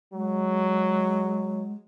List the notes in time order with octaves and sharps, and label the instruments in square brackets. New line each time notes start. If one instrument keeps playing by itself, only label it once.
[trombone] F#3 [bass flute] G#3